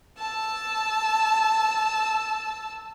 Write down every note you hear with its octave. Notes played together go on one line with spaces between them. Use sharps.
A5 E6